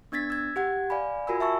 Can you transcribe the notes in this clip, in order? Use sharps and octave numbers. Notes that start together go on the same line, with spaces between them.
B3 D4 G#6 A6 B6
E6 G#6
G4 F#5 G#6
D5 F5 G#5 B5
F4 F#4 A#4 G#5 B5 E6
E5 A5 C#6 E6